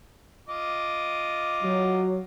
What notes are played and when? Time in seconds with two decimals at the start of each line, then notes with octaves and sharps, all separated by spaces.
0.49 F4 D#5 D6
1.64 F#3